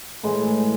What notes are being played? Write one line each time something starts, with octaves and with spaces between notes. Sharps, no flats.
A2 E3 G#3